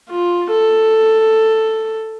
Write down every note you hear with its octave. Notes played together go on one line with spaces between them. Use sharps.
F4
A4